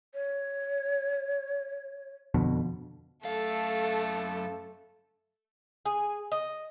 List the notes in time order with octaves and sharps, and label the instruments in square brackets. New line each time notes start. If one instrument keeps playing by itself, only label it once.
[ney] C#5
[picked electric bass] F2 B2 D3
[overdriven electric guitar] F#2 F5 [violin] A3 A4
[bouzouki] G#4
D#5